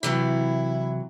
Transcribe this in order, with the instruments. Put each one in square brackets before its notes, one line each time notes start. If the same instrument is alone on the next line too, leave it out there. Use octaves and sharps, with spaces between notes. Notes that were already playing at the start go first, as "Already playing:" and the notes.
[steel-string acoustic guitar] C3 E3 F#3 [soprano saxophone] E4